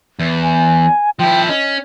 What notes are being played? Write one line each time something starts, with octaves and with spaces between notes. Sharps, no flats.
E2
G#5
F3 E4 G5
C#4 D#5